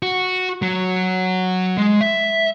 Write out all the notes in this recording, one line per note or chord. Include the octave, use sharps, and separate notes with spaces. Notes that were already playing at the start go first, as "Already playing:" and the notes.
F#4
F#3
G#3
E5